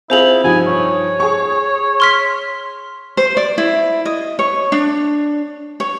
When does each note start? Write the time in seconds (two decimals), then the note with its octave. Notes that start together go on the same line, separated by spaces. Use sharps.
0.10 C4 E4 F4 G#4 C5 F7 F#7
0.44 G2 F3 D#4 G#5
0.67 C#5
1.20 G#4 C#6
2.00 C6 F6 B6
3.17 C5
3.37 D5
3.58 E4
4.05 D#5
4.39 C#5
4.72 D4
5.80 C#5